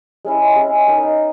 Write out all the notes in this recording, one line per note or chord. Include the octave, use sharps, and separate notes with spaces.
G#3 C#4 E4
G#3 C#4 E4
D#4 A#4 D#5